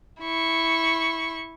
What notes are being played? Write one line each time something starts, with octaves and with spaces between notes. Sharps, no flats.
E4 C#6